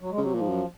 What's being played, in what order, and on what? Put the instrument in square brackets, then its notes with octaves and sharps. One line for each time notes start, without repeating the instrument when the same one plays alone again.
[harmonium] F#3
G#3
[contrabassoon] C#3 [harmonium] F#3
[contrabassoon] C3
[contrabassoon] A#2 [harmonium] F3
[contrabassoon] G#2
F#2